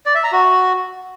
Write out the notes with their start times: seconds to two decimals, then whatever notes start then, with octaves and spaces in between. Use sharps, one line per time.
0.06 D5
0.15 E5
0.24 A#5
0.32 F#4